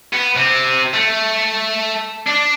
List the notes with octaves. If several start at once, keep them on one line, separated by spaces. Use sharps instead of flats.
B3
C3 C4
A3
D4